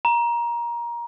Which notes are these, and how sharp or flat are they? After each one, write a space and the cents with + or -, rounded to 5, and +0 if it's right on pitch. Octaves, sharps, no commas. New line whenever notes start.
A#5 +20